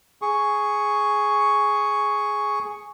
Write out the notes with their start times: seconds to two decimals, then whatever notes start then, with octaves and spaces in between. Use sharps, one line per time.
0.22 G#4 C#6